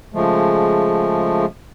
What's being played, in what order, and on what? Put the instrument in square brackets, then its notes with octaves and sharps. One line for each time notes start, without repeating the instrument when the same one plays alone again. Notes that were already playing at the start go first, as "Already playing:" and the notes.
[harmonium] C#3 F3 G#3 A3